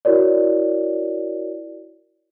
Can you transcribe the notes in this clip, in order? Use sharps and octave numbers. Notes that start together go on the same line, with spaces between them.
E4 F#4 A#4 C#5 D5